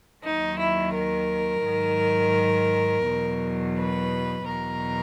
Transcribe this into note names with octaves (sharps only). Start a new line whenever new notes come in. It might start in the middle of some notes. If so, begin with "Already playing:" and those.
D#2 D#3 F#3 D#4
E4
A#4
G#2 D#3 F#3
E2 B2 F#3
B4
E2 B2 F#3 A#4